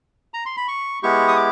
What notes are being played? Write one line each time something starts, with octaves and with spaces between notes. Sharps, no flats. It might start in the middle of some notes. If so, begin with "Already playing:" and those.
A#5
C6
B5
C#6
G#3 B3 E4 G4 C#6
D#6
D6